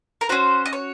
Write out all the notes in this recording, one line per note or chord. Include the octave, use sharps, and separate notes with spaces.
A#4
C#4 F#4 C5
D#5
C#5